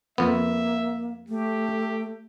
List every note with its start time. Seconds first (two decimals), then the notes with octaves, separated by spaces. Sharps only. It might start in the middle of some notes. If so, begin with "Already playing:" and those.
0.18 F2 A#3 B3 E5
1.29 A3 G4